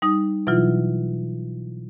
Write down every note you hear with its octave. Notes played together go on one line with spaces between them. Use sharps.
G3 D#4 D#6
B2 E3 F#3 E4 F4